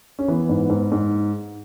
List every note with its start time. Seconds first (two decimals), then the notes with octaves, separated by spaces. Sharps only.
0.19 C#4
0.28 E3 B3
0.49 G#2
0.70 G#2
0.92 G#2